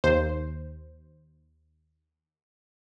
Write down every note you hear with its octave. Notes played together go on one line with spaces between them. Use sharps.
D#2 C5